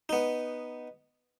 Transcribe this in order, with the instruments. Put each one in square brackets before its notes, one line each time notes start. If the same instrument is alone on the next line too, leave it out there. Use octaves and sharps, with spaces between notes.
[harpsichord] B3 D#4